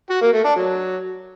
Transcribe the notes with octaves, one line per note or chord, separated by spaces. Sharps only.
F#4
A#3
A3
D4
F#3